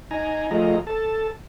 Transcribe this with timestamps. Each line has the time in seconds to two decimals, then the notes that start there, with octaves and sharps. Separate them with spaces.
0.11 D#4 G#5 A#5
0.51 F3 A3 F4 G#4 D#5 A#5
0.87 A4 A5